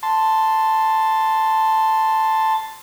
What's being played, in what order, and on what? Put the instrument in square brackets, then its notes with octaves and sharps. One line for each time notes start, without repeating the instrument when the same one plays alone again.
[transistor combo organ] A5 C6